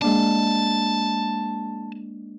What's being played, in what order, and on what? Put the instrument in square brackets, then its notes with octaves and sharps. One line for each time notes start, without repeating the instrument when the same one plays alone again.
[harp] G#3 A#3 D4 [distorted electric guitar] A5